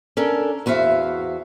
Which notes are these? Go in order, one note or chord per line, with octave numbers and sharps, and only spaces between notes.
C#4 D4 A4 A#4
E2 F#4 C5 E5 F5